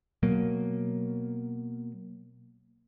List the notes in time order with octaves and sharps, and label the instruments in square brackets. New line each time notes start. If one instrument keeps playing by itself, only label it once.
[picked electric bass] B2 F#3 A#3